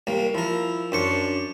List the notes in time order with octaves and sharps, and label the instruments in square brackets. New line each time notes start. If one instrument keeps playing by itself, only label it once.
[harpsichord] C2 A#3
[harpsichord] F3 A#4 [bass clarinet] E4
[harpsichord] F#2 C5 C#6 [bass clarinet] D4